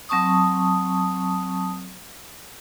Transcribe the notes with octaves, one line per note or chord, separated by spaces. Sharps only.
F#3 C4 A5 C#6 D#6